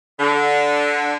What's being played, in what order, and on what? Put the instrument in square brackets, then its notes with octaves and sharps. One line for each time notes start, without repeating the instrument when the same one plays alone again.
[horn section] D3